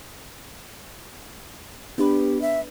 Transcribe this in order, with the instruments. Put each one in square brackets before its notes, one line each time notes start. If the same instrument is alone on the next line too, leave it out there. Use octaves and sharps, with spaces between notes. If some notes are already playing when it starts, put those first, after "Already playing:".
[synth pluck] B3 D4 B4 [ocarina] G4
[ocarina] E5